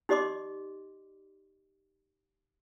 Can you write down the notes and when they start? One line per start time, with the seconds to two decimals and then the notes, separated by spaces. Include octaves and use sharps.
0.09 D#4 G4 D5 D#5 C6 D6